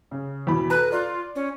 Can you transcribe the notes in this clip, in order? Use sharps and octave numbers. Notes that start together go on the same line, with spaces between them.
C#3
E2 B2 B5
A4 B4 A#5
F4 D5
C#4